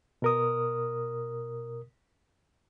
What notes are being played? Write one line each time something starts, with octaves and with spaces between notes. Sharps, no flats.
B2 A#4 D#6